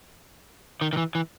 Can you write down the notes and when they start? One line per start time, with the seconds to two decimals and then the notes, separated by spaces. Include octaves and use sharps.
0.81 D#3
0.93 D#3
0.97 E3
1.15 E3